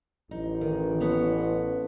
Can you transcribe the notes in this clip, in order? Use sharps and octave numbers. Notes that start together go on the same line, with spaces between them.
A1 D#4
D#3
B3 A4 C#5